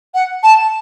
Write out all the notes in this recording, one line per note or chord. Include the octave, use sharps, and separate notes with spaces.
F#5
A5